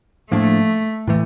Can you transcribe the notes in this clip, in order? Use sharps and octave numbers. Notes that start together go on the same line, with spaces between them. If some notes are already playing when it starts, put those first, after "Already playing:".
A2 F3 A3 A#3 D4
A2 E3 A3